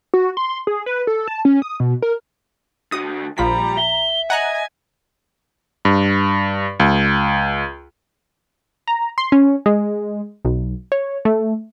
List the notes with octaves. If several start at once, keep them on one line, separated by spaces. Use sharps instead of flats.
F#4
C6
G#4
B4
A4
A5
C#4
D#6
B2
A#4
D3 F#4 D#6
A#1 F3 G3 A#5 B5 B6
E5 G7
D#5 F#5 G#5 A#5 F#6
G2
C#2
A#5
C6
C#4
G#3
B1
C#5
A3